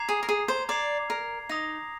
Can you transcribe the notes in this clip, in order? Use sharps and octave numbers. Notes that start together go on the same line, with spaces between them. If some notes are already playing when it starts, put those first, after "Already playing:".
Already playing: A#5 D6 G#6 C7 F7
G#4
A#4
G#4
C5
D5 A#5 D6 G#6 C7 F7
A#4
D#4 D#6 A#6 F7